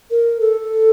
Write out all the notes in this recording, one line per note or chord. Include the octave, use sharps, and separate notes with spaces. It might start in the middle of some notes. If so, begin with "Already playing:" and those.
A#4
A4